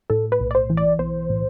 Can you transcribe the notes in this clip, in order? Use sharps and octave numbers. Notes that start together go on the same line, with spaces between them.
A2 A4
B4
B1
D5
C5
E3
D5
B1 C5
A2